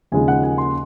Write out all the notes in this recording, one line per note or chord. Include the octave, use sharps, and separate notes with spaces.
D#2 C#3 F3 G#3 D#4 G#5
F#5
G#5
C6